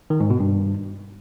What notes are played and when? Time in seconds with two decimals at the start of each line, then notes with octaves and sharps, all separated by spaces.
0.10 D#3
0.20 G#2
0.30 B2
0.40 G2